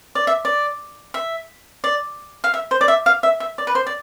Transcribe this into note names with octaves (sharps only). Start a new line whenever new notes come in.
D5
E5
D5
E5
D5
F5
E5
C5
D5
E5
F5
E5
E5
D5
B4
C5
D5